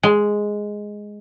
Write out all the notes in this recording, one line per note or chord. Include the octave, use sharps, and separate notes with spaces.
G#3